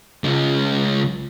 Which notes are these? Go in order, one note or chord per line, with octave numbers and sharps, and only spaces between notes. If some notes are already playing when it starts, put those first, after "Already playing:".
C#2 G#3